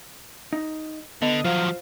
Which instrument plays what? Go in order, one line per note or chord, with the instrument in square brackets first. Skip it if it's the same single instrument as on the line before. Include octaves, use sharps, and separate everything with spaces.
[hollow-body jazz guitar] D#4
[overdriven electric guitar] D3 [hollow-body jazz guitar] B3 [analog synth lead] D#5
[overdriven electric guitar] F3 F#3 [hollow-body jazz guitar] F4 C5 [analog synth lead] F5